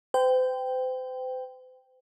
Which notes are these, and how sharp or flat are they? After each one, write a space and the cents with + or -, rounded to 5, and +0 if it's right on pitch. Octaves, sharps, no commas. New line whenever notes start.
C5 -40 G5 +0